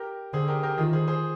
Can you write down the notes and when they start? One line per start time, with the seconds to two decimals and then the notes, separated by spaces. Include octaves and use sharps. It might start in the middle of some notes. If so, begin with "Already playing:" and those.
Already playing: G4 A#4
0.33 D3 G#4 C5
0.48 G4 A#4
0.63 G4 A#4
0.78 D#3 F4 G#4
0.93 G#4 C5
1.08 G#4 C5